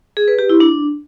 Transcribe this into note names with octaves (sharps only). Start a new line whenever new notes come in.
G#4
B4
G4
E4
D4